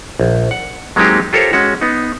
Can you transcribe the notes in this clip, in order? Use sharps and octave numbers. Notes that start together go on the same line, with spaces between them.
A#1
F#5
F#3 G#3 A#3 C4 D#4 G4
F4 G4 A4 A#4 C5 C#5
G#3 C#4 F#4
B3 D#4